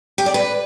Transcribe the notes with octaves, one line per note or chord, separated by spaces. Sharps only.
G4
D5
B4